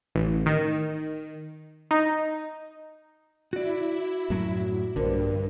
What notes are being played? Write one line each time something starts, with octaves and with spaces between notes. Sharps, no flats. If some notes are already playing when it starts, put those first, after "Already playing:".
A1
D#3
D#4
E4 F#4 D5
F#2 A2 F#3
A#1 G2 D3 A#4 C5